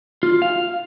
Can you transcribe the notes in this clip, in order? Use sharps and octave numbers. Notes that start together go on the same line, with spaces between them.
F4
F5